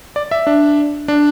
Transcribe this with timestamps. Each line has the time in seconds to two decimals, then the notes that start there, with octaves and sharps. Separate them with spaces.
0.16 D5
0.31 E5
0.47 D4
1.08 D4